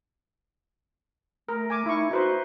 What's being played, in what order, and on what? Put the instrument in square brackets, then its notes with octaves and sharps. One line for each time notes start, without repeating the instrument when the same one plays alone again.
[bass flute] A3 [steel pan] A#4
[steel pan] G#5 D6
[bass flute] D#4 [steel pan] E4 C#6
[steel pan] D#4 B4 C5 [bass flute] F#4